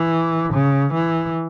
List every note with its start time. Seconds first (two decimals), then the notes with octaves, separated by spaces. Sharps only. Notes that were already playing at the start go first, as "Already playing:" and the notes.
Already playing: E3
0.53 C#3
0.94 E3